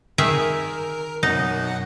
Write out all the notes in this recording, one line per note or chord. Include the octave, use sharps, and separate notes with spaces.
D#3 G#4 A#4 E5
F#2 B2 D#4 F#5